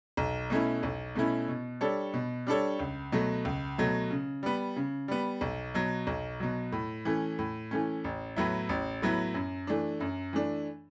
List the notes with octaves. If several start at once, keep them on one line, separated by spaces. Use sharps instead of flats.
B1
B2 A3 C#4 E4
B1
B2 A3 C#4 E4
B2
G3 D4 A4 C#5
B2
G3 D4 A4 C#5
C#2
B2 F#3 A3
C#2
B2 F#3 A3
C#3
G3 B3
C#3
G3 B3
B1
B2 F#3
B1
B2 F#3
A2
E3 A3 C#4
A2
E3 A3 C#4
A1
A2 F#3 B3 E4
A1
A2 F#3 B3 E4
F#2
E3 A3 D4
F#2
E3 A3 D4